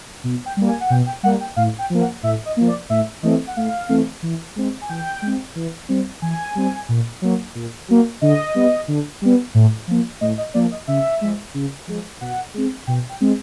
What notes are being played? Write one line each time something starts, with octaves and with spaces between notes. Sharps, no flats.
B2
G5
G3 A#3
G#5
F#5
B2 G5
G5
G3 A#3 F#5
G5
A2 F5
G5
F3 A#3
F#5
A2 E5
D#5
F3 A#3
D5
A2 E5
E3 A3 C4 D#5
F#5
A2 F5
E3 A3 C4
E3
G#3 C4
G#5
E3 G5
G#3 C4
E3
G3 C4
E3 G#5
G3 C4
A#2
F#3 A#3
A#2
F#3 A#3
D3 D#5
G3 B3
D3
G3 B3
A2
F3 A#3
A2 D#5
D#5
F3 A#3 D5
D#5
C#3 E5
F3 G#3
C#3
F3 G#3
B2 F#5
G#3 C4
B2 G5
G5
G#3 C4